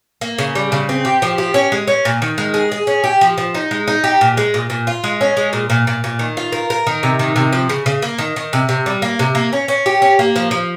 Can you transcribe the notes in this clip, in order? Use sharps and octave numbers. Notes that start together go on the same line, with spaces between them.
A#3
C#3
G3
C#3
C4
G4
F3
G4
C#4
G#3
C#4
A#2
D#3
G#3
G#4
G#4
C#4
G4
F3
F3
D#4
G#3
D#4
G4
A#2
G#3
A#2
A#2
F4
G#3
C#4
G#3
A#2
A#2
A#2
A#2
D#3
F4
A#4
A#4
D#3
C3
D#3
C3
F3
C#3
C#3
A#3
D#3
D#3
C3
C3
G3
A#3
C3
A#3
C#4
C#4
G4
C#4
A#3
F3
F3